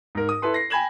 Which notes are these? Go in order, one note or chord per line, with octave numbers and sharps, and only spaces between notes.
G#2 A#4
D#6
E4 A4 B4 C6
A#6 C7
G5 G#5 B5 G#6 E7 F#7